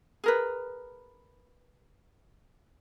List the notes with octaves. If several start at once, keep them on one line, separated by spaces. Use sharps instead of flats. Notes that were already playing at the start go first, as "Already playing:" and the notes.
G#4 A#4 B4